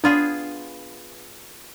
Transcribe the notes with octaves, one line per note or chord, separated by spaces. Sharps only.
B3 D4 F4 G#4